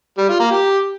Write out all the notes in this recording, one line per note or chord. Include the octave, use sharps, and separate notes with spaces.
G3
F4
A#3
G4